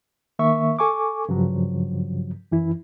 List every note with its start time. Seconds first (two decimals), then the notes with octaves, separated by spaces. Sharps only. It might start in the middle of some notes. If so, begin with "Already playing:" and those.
0.39 D#3 A#3 E5 C#6
0.79 A4 G#5 C#6 D6
1.29 G2 C#3 F3 F#3
2.52 F#2 E3 E4